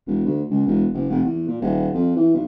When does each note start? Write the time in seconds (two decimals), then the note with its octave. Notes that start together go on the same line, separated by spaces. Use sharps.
0.06 E1
0.25 D2
0.50 C#2
0.66 E1
0.93 F#1
1.09 F1
1.24 E2
1.48 A#2
1.61 D#1
1.94 F2
2.16 E3
2.34 B1